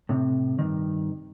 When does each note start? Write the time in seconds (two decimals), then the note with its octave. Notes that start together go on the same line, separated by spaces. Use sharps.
0.09 A2 C3
0.59 G2 D#3